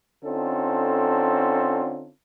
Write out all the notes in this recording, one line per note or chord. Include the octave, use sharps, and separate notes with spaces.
D3 C4 C#4 D#4 F4 A4